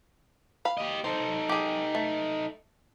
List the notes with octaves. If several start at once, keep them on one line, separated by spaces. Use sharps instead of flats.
F5 B5
G4 D#5
D#4 A4 C5
G4 G#4
A3